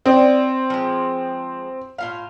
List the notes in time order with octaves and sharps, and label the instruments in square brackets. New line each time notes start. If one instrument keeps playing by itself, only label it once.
[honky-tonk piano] C4 [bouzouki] E4 D5 D#5
[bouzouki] F3 G#3
A2 F4 F5